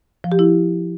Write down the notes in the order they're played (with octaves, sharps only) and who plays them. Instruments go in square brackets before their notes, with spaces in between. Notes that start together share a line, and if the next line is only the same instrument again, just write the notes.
[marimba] F3
G4
E4